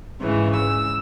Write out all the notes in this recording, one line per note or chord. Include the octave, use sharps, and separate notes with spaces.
G#2 C#3 E3
E6